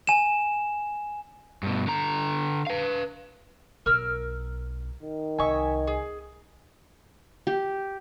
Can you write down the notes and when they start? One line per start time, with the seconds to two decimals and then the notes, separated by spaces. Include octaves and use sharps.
0.07 G#5 E7
1.63 G2 B2
1.87 D3 A#5
2.67 B4 F5
3.86 B1 A#4 E6 F6
5.03 D#3
5.39 C2 D#5 E5 G#5 C#6
5.87 G#4
7.47 G4